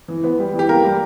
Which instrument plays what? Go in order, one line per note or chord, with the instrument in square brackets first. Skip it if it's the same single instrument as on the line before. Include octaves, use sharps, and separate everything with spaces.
[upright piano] E3
B3
G3
E3
[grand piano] G4
[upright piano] A#3 [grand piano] A#4
[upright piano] G3